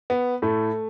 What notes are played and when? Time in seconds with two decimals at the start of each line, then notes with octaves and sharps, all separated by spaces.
0.10 B3
0.42 A2 A3